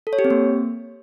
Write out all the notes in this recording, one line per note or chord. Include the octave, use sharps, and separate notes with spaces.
A4
C#5
G4
C4
A#3